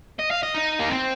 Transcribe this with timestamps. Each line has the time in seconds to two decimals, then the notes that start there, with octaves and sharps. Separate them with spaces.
0.19 D#5
0.31 F5
0.43 D#5
0.55 D#4
0.79 A#3
0.90 C4